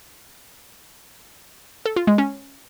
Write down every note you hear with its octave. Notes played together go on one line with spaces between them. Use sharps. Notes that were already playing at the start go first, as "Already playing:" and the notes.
A4
F4
G#3
C#4